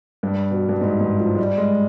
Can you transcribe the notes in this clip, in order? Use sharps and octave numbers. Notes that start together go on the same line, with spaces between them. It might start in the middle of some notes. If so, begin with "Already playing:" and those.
G2
B2
G2
G#2
G#2
F3
G#3
G3
G#3